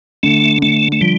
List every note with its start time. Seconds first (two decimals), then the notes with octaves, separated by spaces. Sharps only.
0.23 D3 A3
0.62 D3 A3
0.92 A3
1.00 F3 G3